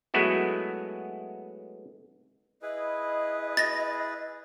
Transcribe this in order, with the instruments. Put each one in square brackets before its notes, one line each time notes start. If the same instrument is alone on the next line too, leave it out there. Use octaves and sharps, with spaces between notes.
[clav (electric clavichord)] F#3 G#3 A3 B3 E4 F#4
[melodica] E4 G#4 B4 [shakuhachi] D#5
[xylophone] A6 A#6